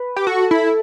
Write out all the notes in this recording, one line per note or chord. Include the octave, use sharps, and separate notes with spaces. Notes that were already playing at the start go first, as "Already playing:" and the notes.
Already playing: B4
G4
F#4 A4
E4